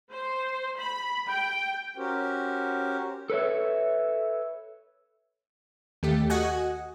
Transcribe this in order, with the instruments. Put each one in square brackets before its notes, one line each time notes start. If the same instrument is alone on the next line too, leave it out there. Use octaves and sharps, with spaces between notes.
[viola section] C5
B5
G5
[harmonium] C#4 F#4 G4 A#4 C5
[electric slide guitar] A4 B4 C#5 E5
[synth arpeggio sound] D#2 A3 G4
F#4 D#5 F#5 G#5